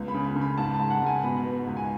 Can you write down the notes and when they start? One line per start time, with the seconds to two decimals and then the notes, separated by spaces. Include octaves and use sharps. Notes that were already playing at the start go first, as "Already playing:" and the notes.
Already playing: C#2 B3
0.08 B5
0.14 C#3
0.25 B5
0.36 C#3
0.42 B5
0.58 G#2 A5
0.74 A5
0.79 G#2
0.90 F#5
1.02 G#2 G#5
1.23 B2 B5
1.45 B3
1.67 C#2
1.77 G#5